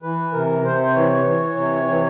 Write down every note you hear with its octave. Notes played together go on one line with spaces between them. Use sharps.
E3 B4
C3 A#4
C3 C5
E3 C#5
E3
C3
E3